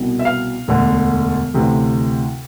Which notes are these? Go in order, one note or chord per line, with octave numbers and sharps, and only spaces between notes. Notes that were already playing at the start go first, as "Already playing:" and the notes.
Already playing: C2 B2
E5
F5
E1 D2 D3
D2 C3 E3